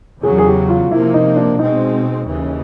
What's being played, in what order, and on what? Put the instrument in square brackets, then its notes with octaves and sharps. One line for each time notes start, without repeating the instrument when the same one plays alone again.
[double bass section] E2 C#3 F#3 [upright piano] G#4
[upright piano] G#4
G4
F4
[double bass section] C3 F3 A#3 [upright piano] E4
[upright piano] D#4
D4
[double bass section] B2 G#3 C4 [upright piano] D#4
[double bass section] D#2 C#3 E3